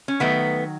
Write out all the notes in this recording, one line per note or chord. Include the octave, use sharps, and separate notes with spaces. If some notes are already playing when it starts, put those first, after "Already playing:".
C#4
D#3 F#3 A3 B3